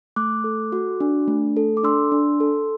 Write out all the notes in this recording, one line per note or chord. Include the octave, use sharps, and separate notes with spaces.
A3 D6 F#6
A4
F#4
D4
A3
A4
D6
D4 C6 E6
D4
A4